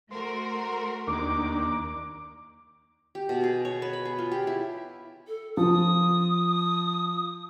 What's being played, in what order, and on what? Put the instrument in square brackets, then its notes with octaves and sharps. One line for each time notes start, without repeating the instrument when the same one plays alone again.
[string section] A3 F#4 A#4 [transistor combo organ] C5
[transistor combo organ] D#2 A#3 D4 [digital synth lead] D6
[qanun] G4
B2
G#4
C#5
B4
B5
G#4
F4
G4
E4
[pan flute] A4
[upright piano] F3 [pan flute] D#6